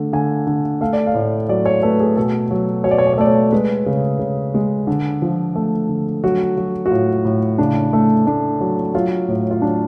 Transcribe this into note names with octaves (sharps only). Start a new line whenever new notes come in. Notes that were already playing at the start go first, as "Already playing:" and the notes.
Already playing: D3 A3
D3 G#5
D3
A3 F5
D5
F5
A2
F#3 D5
C#5
A3 B4
G#4
B2 A4
F#3
B2 C#5
D5
C#5
D5
C#5
A3 D5
C#5
G#3 B4
C#3
C#3
G#3
D3
F3
A3
D3
F#3 F#4
F#3
F#4
A2 F4
A2
C#3 D4
A3
A3 D4
F#3
F#3 F4
A2
F4
F#3 D4